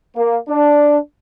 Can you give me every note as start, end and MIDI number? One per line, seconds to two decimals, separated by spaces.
0.16 0.37 58
0.48 0.96 62